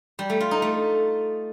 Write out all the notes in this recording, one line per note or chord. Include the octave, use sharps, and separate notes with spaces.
G3
A3
F4
D#4
A3